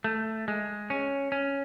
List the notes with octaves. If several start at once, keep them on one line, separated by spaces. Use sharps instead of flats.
A3
G#3
C#4
C#4